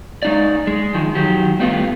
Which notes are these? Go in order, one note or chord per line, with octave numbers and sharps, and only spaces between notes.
G#3 D#4 D5
G#3
D#3 F3
D#3 F#3 G4
A2 G3 A3 B3 F4